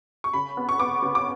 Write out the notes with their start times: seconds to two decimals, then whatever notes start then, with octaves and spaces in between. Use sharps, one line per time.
0.24 C#6
0.33 C#3 B5
0.57 B3
0.69 C#6
0.79 B3 D6
1.02 C#3
1.15 D6